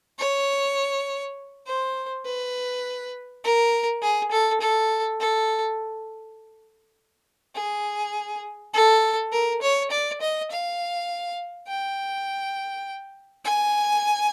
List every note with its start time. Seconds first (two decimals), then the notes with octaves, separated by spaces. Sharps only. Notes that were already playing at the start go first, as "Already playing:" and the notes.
0.19 C#5
1.66 C5
2.26 B4
3.44 A#4
4.02 G#4
4.31 A4
4.61 A4
5.20 A4
7.55 G#4
8.74 A4
9.32 A#4
9.62 C#5
9.91 D5
10.21 D#5
10.50 F5
11.68 G5
13.45 G#5